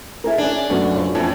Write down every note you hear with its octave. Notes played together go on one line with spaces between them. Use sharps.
E4 G#4 A#4
C#4 D4 G#4
F#2 A3 B3 C#4
C#3 F3
F2 A2 E3 C#4